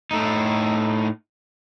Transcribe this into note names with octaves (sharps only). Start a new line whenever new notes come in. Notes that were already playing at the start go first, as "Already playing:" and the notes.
A2 A3 D#4